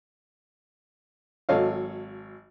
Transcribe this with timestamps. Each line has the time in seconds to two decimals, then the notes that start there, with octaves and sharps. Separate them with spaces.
1.49 G#1 F#3 A4 C#5 D#5 F5